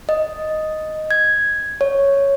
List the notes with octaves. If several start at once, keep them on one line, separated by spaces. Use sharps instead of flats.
D#5
G#6
C#5